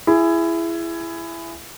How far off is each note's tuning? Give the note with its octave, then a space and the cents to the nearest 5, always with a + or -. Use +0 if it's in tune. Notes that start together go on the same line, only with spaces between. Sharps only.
E4 +20 G#4 +0